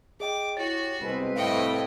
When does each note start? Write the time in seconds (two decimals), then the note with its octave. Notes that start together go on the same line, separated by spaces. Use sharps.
0.20 G#4 D#5 G5 D6
0.57 E4 F#4 G4 C#5 A6
1.01 C2 B2 G#3 C4 B4
1.36 C2 A2 D#5 F5 G5 C#7